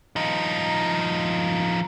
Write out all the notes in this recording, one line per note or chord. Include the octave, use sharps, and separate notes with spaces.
F3 D#4